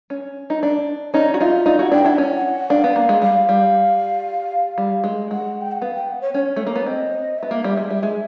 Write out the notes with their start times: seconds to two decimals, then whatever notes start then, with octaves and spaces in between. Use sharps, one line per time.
0.10 C#4
0.50 D#4
0.63 D4
1.14 C#4 D#4 D5
1.34 F#4
1.40 D#4 F4 E5
1.66 D#4 F4 D5
1.79 E4 F#4 F#5
1.92 D4 E4 G5
2.05 D4 E4 F#5
2.18 C#4
2.70 D4 F5
2.84 B3
2.96 A#3
3.09 G#3
3.22 G3 F5
3.49 G3
4.78 G3
5.04 G#3
5.31 G#3 F#5
5.61 G5
5.72 F#5
5.82 B3 F5
5.95 G5
6.09 F#5
6.21 C#5
6.34 C#4 C#5
6.56 A3
6.67 A#3
6.76 B3
6.86 C4 D#5
7.38 B3 E5
7.51 A#3
7.64 G3
7.77 G#3
7.90 G3
8.03 G#3